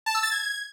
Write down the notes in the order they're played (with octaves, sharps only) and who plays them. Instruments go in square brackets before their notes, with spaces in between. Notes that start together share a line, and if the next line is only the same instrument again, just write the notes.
[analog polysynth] A5
E6
A6
G#6